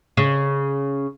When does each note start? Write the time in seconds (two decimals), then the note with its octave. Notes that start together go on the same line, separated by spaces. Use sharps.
0.17 C#3